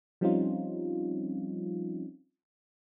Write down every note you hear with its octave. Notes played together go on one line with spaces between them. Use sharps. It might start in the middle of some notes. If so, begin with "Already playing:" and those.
F3 G3 C4 C#4 D#4 F4